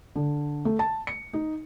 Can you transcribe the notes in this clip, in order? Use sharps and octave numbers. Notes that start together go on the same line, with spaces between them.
D3
A3
A5
C#7
D#4